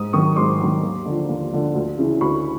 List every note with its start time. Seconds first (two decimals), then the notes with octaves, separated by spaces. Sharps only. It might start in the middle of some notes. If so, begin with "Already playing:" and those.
Already playing: G#2 D#6
0.13 D#3 F#3 C#6 D#6
0.36 G#2 C6 D6
0.60 D#3 F#3
0.83 D#2
1.06 D3 F3
1.29 D#2
1.51 D3 F3
1.75 D2
1.98 C#3 E3
2.21 D2 B5 C#6